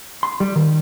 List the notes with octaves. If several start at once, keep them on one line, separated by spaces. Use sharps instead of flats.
C6
G3
D#3